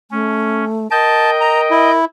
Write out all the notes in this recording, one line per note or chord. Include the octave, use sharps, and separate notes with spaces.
A3 C#4
A#4 D#5 G5 A5 G6
A#5
E4